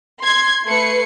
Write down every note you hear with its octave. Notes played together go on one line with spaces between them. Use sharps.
C6 G#6
A3 B4 C7 C#7